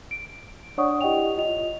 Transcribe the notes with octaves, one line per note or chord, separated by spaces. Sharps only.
D7
D4 C#5 D5 F#5 C#6 D#6
E4 G4 D#5 F#5 G5 F7
F4 D#5 F7